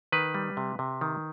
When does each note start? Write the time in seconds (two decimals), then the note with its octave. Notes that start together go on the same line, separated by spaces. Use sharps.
0.12 D#3 B4
0.34 G3
0.57 C3
0.79 C3
1.01 D#3